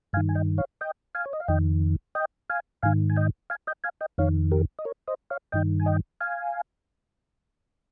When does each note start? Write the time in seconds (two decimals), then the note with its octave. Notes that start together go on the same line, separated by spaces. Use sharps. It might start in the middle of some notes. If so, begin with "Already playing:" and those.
0.13 G2 F5 G#5
0.17 D#3
0.29 G#5
0.35 D#5 G5
0.58 C#5 F5
0.81 D#5 G5
1.15 F5 G#5
1.26 C#5
1.33 D#5
1.40 F5
1.48 F2 D#3 D#5 G5
2.15 D#5 G5
2.50 F5 G#5
2.83 G#2 D#3 F5 G#5
3.10 G#5
3.16 D#5 G5
3.50 F5 G#5
3.67 D#5 G5
3.84 F5 G#5
4.01 D#5 G5
4.18 F2 D#3 C#5 F5
4.52 G4 A#4
4.79 D#5
4.85 A#4 C#5
5.08 C5 D#5
5.30 C#5 F5
5.52 G2 D#3 D#5 G5
5.80 G#5
5.86 D#5 G5
6.21 F5 G#5